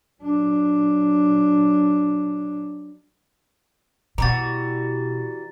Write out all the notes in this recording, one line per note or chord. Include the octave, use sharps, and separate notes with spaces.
F#3 D4
B2 E3 G3 F#4 A#5 A6